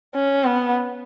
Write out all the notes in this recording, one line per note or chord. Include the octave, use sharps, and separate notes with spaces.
C#4
B3